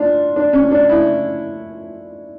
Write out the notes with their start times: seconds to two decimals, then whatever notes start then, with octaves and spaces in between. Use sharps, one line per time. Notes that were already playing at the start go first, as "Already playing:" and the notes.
Already playing: D4 F4
0.36 D4
0.53 C#4
0.71 D4
0.89 E4